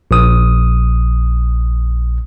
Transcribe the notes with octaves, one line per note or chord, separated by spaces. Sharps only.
A#1 D#6